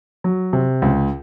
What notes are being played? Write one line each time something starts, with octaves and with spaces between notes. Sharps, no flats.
F#3
C3
C#2